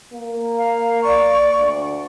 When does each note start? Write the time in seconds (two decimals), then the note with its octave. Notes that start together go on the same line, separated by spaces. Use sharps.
0.14 A#3
0.57 F5
1.02 D5 C#6
1.57 D2